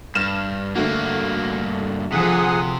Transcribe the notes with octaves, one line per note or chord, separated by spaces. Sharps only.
G2 F6 E7
G2 D3 A3 A#3 F#4
C3 F3 G#4 F#5 D#6